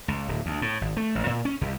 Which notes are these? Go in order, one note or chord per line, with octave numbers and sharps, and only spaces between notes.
C#2
D1
D2
A2
G#1
A3
A1
A#2
C#4
C2